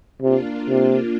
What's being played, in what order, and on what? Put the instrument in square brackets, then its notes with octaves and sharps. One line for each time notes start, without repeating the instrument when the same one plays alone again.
[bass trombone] C3 [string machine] A#3 D4 F4
[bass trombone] C3